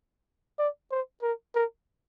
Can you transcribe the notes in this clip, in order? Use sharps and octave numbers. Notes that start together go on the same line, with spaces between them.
D5
C5
A#4
A#4